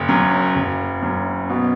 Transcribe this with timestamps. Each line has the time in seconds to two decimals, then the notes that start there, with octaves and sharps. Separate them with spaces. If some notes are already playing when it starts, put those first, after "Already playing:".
Already playing: F#1
0.09 F#2
0.55 F#1
1.02 F#2
1.49 B2